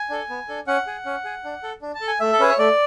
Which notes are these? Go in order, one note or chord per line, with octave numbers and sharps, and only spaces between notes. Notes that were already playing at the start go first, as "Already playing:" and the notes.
Already playing: G#5
D4 A4
B3
D4 A4
C#4 F#5
G#4
C#4
G#4
D4
A4
D4
A5
A4
G#5
A3 E5
A4
C#4 G#4 B4
C#5
A3 D5